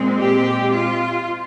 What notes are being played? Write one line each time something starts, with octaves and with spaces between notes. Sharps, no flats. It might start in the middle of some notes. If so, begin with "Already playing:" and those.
Already playing: A#2 G#3 C4
G4
F4